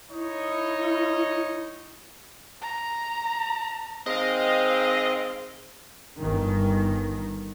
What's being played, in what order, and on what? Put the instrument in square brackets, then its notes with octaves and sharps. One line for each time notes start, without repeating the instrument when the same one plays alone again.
[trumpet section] D#4 C#5 D#5 [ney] E4
[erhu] A#5
[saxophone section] D#3 G#3 C4 [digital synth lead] D#5 [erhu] F5
[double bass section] G1 D#3